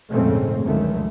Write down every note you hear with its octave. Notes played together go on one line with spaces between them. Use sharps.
A#1 F2 G#2 C#3 A3 C4
F#1 C#2 D3 D#3 F3 A3